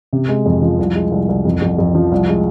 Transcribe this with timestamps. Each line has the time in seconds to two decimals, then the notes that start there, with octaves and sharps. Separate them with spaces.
0.13 C3
0.29 G#3
0.46 F2
0.62 F3
0.79 C2
0.95 G#3
1.12 C2
1.29 C2
1.45 F2
1.62 F2
1.78 F2
1.95 F3
2.12 C2
2.28 G#3